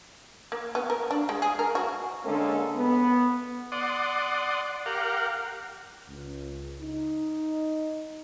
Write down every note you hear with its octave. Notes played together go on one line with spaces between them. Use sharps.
A#3
B3
A#4
D4
G#3
G#4
A#4
F#4
D3 G#3 A#3 C#4 A4
B3
D5 F#5 C6 D#6
G4 A#4 F5 F#5
C#2
D#4